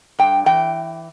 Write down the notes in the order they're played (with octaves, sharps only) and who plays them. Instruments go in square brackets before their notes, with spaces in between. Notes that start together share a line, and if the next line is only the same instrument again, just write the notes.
[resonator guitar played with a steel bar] G2 G5
E3 G5